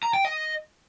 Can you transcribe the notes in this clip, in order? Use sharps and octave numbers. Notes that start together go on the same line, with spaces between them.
A#5
G5
D#5